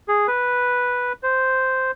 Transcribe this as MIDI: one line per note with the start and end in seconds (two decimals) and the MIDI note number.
0.08 0.27 68
0.28 1.13 71
1.23 1.91 72